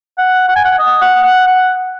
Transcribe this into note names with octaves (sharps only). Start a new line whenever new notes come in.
F#5
F#5
G#5
F#5
D#5
F#5
F#5
F#5